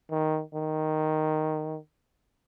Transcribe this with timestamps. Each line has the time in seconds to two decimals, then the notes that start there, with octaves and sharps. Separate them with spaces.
0.10 D#3
0.55 D#3